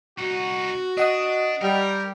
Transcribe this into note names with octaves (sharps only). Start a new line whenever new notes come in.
C2 D#4 F#4
D4 D#5 F#5 D#6
G3 A#4